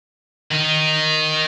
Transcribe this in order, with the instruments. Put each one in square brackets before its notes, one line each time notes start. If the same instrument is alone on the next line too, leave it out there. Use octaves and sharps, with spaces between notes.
[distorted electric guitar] D#3 D#4